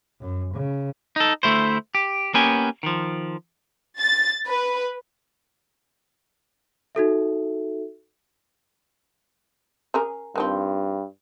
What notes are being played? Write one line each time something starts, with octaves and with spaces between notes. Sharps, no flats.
F#2
C#3
D#4 A4
D2 A3 E4 C5
G4
A#3 B3 C#4 G4 G#5
D#3 F3
A6
B4
D#4 F#4 A4 E5
C#4 G#4 A#4
G2 D#3 F3 C4